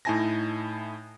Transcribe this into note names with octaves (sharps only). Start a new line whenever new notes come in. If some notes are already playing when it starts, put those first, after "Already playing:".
A2 D#4 E4 G#5 A5 A#6